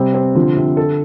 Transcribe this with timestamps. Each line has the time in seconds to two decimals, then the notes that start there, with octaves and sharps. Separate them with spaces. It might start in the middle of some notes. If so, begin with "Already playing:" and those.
Already playing: C3 G3 C4
0.14 C4
0.35 D3 F3
0.56 C3
0.77 A4